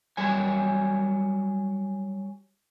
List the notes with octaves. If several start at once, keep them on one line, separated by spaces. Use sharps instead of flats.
F#3 G3 C#5 G#5